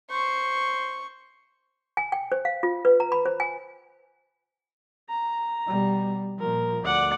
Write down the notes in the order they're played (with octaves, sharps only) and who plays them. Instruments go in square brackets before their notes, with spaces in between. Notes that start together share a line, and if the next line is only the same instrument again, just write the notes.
[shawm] C5 [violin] C#6
[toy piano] G#5
G5
C5
F5
F4
B4
A#5
B5
C5
G#5
[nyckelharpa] A#5
[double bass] B2 G3
[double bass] A#2 F3 [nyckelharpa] A#4
[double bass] D2 [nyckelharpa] D5 F#5